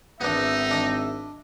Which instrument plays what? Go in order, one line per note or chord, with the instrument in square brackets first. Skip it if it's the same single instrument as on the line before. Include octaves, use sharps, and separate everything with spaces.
[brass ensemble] G#1 E5 [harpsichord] B3 D4 [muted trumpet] D#4
[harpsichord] D4 D#5